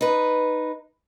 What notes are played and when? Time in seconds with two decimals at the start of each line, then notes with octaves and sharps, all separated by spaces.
0.01 D#4 B4